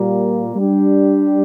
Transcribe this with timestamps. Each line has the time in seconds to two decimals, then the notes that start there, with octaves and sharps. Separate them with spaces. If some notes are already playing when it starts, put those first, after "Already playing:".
Already playing: A#2 G3 A#3
0.55 G3 D4 G4